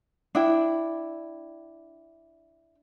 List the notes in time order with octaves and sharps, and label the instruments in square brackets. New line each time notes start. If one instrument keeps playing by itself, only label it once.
[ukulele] D4 E4 G5